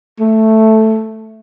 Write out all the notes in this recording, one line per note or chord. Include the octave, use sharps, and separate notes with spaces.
A3